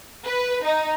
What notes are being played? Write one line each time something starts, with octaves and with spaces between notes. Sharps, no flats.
B4
D#4